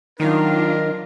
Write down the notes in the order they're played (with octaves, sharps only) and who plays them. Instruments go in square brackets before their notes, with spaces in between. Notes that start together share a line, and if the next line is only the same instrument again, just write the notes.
[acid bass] D#3 [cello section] F#3 D4 F4 [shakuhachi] D#4 [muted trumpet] A#4